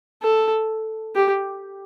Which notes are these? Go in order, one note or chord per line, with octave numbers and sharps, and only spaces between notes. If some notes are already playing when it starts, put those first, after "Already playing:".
A4
G4